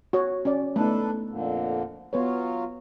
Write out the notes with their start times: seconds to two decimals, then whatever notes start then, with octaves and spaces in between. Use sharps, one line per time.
0.13 F#4 C#5
0.45 C#4 D5
0.76 A3 B3 D4 D#4 A4 B4
1.29 F2 A#2 D3
2.13 F#3 B3 F4 B4 C#5